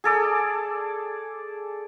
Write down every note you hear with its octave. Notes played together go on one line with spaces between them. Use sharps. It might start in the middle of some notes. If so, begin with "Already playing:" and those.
G#4 A4 D5